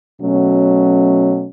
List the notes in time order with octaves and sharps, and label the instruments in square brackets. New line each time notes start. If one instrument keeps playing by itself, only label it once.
[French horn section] B2 F#3 A3 C#4